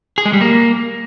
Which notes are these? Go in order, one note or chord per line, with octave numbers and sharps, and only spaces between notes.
G#4
G#3
G3
A#3